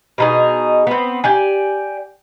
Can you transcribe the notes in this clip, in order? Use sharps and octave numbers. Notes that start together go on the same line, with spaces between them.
B2 D#4 G#4
B3 C4
G4 D5 G#5